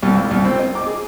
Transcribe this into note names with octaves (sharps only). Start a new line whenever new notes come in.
C2
C#2
C2
C4
D#5
D6
G#4